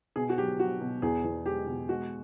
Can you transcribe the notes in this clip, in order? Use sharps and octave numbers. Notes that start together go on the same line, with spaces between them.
B2 G#4
F#4
F#3 G4
F#3 F#4
B2
E2 G#4
E2
G#3 G4
B2
G#3 F#4